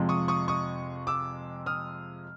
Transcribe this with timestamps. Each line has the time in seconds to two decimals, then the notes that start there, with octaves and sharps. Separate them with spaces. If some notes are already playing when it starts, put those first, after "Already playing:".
Already playing: F2 C3 F3 G#3
0.09 C#6 D#6
0.28 C#6 D#6
0.48 C#6 D#6
1.07 D6 E6
1.66 D#6 F6